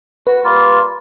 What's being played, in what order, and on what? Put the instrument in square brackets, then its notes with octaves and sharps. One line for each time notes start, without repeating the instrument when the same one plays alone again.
[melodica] F#4 [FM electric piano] B4
[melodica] G3 A#3 F4